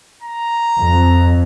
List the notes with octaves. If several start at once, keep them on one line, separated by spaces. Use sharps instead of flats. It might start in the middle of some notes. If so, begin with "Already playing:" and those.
A#5
F2